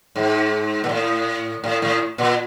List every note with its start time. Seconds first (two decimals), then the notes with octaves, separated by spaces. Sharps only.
0.15 G#2
0.84 A#2
0.89 A2
1.64 A2
1.82 A2
2.18 A#2